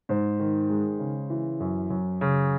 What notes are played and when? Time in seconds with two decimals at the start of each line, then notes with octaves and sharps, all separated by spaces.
0.09 G#2 C5
0.40 D#3
0.70 G#3
0.99 C#3
1.30 E3
1.60 F#2
1.90 F#2
2.21 C#3